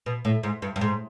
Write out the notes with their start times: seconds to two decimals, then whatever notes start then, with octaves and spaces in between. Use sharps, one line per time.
0.06 B2
0.25 A2
0.43 G#2
0.62 G2
0.76 G2
0.81 G#2